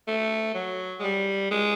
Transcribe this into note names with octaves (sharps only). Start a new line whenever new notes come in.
A3
F#3
G#3
G3
G#3